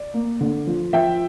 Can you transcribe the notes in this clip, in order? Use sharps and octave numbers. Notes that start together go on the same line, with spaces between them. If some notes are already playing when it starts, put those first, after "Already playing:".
Already playing: D5
A#3
D3
F3
F3 E5 G5